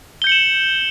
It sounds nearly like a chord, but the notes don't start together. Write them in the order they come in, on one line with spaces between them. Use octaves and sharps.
G7 G6 C#7 F#7 E7